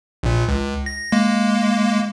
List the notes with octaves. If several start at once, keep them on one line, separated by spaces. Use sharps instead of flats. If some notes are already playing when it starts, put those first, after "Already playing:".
A#1 A#2
C#2
A#6
G#3 A#3